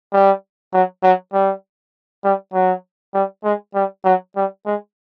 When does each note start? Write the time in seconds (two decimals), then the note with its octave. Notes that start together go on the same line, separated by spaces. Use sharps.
0.13 G3
0.73 F#3
1.03 F#3
1.33 G3
2.24 G3
2.54 F#3
3.14 G3
3.44 G#3
3.75 G3
4.05 F#3
4.36 G3
4.66 G#3